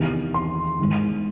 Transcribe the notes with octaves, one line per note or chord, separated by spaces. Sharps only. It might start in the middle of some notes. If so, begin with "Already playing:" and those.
Already playing: E2 C3 D#3
C6
G#2 D#3